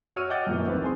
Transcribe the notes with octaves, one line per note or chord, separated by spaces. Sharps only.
F#4 C#5 C#6 E6 F6 D#7
D#5 F#5 G5 D6 G6 A6
F#2 A#2 E3
A1 D#2 C4 B4
C4 G#4 C6